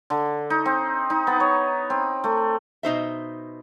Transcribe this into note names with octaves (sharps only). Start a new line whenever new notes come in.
D3
D#4
C4
D#4
B3
C#5
C4
A3
B2 D#4 C5 E5